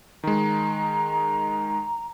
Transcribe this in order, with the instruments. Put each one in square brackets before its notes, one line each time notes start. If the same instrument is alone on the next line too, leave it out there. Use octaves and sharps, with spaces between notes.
[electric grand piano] D#3 G#3 [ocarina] A#5